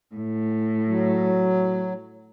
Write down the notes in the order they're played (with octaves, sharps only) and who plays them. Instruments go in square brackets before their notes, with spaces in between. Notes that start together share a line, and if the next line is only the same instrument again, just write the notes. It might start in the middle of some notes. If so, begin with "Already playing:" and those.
[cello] A2
[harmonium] F#3